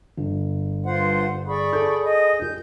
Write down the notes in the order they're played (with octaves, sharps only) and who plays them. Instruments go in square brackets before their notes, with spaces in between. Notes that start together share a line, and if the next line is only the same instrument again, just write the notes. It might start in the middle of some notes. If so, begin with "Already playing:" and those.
[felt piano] G1
[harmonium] G2 F4 F#5 [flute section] C5
[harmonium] G#4 [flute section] D5 B5 C#6
[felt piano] A4 G6
[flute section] D#5
[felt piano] G4 A#4 [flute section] G6